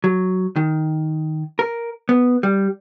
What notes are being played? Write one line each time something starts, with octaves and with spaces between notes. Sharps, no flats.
F#3
D#3
A#4
B3
G3